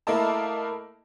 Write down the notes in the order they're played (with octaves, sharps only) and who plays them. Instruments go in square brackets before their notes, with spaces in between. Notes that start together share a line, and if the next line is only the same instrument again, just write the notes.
[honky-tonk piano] A3 A#3 E4 A#4 D#5 A5